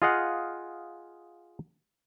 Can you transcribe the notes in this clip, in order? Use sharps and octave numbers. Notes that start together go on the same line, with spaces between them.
F4 G#4 D#5 F5 F#5